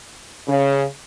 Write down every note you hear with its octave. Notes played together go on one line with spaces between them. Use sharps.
C#3